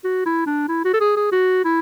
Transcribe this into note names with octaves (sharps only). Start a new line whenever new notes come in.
F#4
E4
D4
E4
F#4
A4
G#4
G#4
F#4
E4